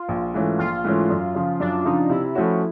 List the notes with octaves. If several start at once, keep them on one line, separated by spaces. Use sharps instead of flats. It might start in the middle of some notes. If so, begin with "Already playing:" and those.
Already playing: F4
A#1
G#2 E3 A3 C#4
A#1 F4
G#2 E3 A3 C#4
F#2
C#3 F3
F#2 D4
C#3 F3 D#4
C3 E4
F3 A3 C#4 F#4